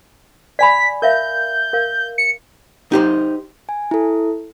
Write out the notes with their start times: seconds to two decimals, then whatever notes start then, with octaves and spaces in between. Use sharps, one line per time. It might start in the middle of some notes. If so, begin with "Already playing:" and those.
0.59 D5 G#5 B5 B6
1.02 A#4 E5 F5 G6
1.73 A#4 F5
2.18 C#7
2.92 D#4 G4 C5
3.69 G#5
3.91 E4 A4